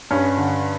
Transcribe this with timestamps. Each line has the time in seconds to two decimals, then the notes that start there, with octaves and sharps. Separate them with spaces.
0.11 G2 C#4
0.37 D3